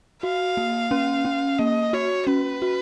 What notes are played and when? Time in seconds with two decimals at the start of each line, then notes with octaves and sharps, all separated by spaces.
0.23 F#4 F5
0.57 A#3
0.91 C#4
1.25 C#4
1.59 A#3 D#5
1.93 F#4 C#5
2.27 C#4 B4
2.62 F#4